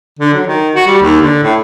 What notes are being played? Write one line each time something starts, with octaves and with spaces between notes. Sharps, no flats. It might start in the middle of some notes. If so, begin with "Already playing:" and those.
D3
F#3
D#3
F#4
G3
D#2
D3
A2